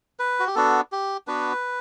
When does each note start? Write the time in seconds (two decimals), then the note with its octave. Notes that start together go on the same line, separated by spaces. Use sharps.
0.19 B4
0.40 F#4
0.47 G4
0.55 B3 D4 F#4 A4
0.92 G4
1.27 B3 D4 F#4 B4